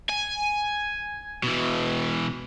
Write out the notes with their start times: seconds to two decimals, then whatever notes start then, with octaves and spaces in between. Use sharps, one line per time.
0.10 G#5
1.43 B2 E3